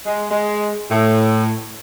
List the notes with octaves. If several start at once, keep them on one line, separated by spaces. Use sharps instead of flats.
G#3
G#3
A2